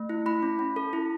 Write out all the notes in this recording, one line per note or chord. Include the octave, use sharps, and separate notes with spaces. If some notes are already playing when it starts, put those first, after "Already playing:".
Already playing: A3
E4
E4 B5
C#4
C#4
A4
E4